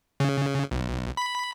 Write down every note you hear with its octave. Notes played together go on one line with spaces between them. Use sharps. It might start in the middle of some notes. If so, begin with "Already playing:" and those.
C#3
B1
B5